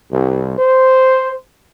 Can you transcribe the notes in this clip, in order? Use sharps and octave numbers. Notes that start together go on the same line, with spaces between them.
C2
C5